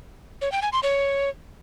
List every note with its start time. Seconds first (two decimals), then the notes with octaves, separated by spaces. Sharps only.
0.41 C#5
0.52 G5
0.62 G#5
0.73 C6
0.83 C#5